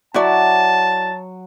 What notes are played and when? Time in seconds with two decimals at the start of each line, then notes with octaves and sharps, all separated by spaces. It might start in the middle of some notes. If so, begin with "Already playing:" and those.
0.14 F#3 E4 F#4 D5 A5